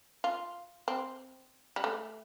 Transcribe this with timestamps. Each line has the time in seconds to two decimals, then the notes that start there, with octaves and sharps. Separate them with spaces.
0.24 F4
0.88 C4
1.76 G3
1.84 A3